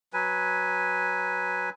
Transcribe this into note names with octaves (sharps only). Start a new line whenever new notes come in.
F#3 B4 G#5